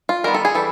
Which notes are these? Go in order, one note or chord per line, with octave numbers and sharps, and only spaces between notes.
F4
D#3 G3 B3 A#4
A4
G#4
E3 G3 A4